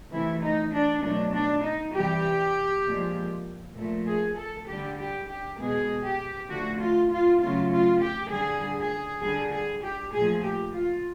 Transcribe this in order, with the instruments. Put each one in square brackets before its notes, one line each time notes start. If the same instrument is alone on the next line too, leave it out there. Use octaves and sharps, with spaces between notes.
[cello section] C3 E3 A3 E4
D#4
D4
B2 F#3 A3 D4
D4
D#4
C3 E3 G3 G4
A#2 F3 G#3
A#2 F3 A3
G#4
A4
D3 G3 G4
G4
G4
B2 G#3 G#4
G4
D3 F3 A3 F#4
F4
F4
C#3 F#3 A3 F4
F4
G4
D3 G3 G#4
G#4
D3 G3 G#4
G#4
G4
A#2 F3 A3 G#4
G4
F4